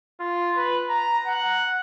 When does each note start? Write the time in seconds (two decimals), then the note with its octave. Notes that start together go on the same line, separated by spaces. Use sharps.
0.20 F4
0.57 B4
0.89 A#5
1.27 F#5